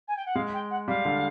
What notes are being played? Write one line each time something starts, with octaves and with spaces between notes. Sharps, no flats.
G#5
G5
F#5
G#3 F5
G5
F#5
G3 F5
D3